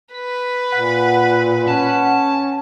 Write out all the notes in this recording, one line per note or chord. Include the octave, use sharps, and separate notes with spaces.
B4 B6
A#2 F#5
C#4 A5